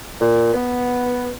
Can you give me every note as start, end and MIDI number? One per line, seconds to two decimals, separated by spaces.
0.20 0.52 46
0.54 1.31 59